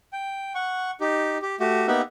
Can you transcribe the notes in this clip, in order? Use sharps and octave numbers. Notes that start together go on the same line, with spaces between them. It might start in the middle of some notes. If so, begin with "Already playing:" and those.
G5
F#5 C#6
D#4 G4
G4
A3 F#4 G4
A#3 B3 D#4 G4 E5 F#5